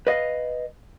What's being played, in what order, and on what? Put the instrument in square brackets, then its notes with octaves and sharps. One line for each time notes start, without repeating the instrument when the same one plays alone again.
[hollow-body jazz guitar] B4 D#5 F5